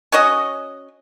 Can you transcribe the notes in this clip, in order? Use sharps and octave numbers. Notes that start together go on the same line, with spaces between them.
C#4 F#4 C#5 D#5